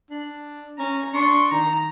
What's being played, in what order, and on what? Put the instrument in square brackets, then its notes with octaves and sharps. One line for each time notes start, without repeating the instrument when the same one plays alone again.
[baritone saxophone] D4
[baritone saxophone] C#4 [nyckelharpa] A#5
[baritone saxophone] D4 [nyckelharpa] C6 C#6
[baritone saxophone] D#3 [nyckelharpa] A#5